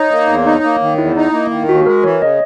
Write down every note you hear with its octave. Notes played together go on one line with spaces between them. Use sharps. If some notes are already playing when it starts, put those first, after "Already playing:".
Already playing: D#4 C#5
A#3
E2
D#4
A#3
D#3
E2 E4
D#4
A#3
D#3
D#2 F#4
G#3 A#4
E3 C#5
C#3 D#5